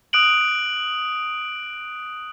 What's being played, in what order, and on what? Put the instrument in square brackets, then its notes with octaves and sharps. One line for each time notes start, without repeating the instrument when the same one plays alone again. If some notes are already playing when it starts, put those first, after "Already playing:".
[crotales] D#6 F#6 D7 F#7